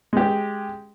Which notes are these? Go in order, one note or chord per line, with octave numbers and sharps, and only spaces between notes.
G#3 G4